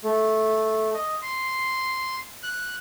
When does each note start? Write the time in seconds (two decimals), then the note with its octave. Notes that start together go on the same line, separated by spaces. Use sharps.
0.04 A3
0.94 D#5
1.22 C6
2.43 F#6